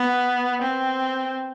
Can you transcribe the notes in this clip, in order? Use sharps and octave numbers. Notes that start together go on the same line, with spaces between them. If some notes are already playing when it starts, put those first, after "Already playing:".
Already playing: B3
C4